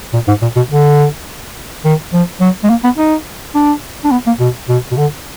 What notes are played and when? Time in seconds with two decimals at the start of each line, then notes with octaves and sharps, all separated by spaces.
0.13 A#2
0.28 G#2
0.42 A#2
0.56 B2
0.71 D3
1.85 D#3
2.13 F3
2.41 F#3
2.64 G#3
2.70 A#3
2.84 B3
2.98 D#4
3.55 D4
4.04 D4
4.11 B3
4.26 A#3
4.40 B2
4.69 B2
4.91 B2
4.97 D3